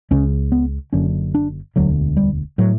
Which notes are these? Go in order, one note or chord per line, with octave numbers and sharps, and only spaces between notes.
C#2 C#3 C#4
B3
F#1 F#2 D3 C#4
D4
E1 D2 D3 F#3
G3
A2 F#3